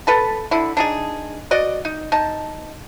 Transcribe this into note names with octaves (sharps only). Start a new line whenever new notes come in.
A4 B4 A5
D3 E4
D4 D#4 G#4
F#4 D5 D#5
D#4
D#4 A5